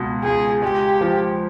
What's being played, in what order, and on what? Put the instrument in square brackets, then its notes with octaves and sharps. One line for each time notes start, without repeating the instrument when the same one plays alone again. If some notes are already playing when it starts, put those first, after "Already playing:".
Already playing: [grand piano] C#2 B2 G#3
[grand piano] C#2 [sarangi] G#4
[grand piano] G#3 [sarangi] G4
[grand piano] F3